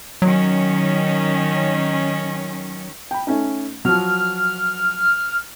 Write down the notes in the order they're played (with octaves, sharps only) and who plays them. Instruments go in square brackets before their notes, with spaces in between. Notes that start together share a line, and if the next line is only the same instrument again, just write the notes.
[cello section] D#3 C#4 [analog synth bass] F#3
[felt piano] G5 B5
A3 C#4 D#4
[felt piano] F3 F#3 [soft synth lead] F6